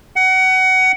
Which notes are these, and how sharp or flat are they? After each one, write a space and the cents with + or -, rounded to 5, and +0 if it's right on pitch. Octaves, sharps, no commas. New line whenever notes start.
F#5 +25